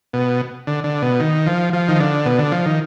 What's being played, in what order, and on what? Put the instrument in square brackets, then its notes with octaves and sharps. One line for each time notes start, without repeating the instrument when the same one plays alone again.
[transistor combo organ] B2
D3
D3
B2
D#3
F3
F3
D#3
D3
B2
D3
F3
D#3